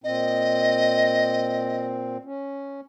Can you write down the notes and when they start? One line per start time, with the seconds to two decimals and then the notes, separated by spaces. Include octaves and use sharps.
0.04 A#2 C4 D#5
2.25 C#4